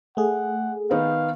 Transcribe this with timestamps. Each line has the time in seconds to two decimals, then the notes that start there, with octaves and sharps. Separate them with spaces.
0.17 A3 G#4 F#5
0.91 D#3 B3 D#4 F5